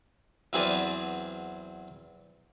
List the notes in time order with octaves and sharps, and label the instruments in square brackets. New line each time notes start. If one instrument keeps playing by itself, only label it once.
[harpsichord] E2 F#3 C4 G#4 B4 D5